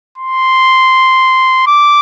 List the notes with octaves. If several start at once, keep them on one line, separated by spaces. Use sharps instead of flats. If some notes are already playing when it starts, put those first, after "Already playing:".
C6
D6